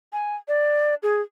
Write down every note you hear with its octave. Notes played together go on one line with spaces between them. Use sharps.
G#5
D5
G#4